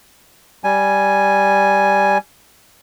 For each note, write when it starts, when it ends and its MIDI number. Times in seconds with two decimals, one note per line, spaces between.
0.64 2.18 55
0.64 2.18 80